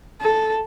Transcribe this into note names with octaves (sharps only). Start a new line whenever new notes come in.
A4